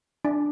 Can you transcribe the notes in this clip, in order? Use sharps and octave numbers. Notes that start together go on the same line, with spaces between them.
D4